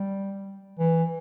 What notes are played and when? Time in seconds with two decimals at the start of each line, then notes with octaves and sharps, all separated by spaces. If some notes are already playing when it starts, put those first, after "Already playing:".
Already playing: G3
0.79 E3